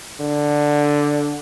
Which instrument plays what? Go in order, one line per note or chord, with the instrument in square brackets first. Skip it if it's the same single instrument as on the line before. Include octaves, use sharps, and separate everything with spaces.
[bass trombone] D3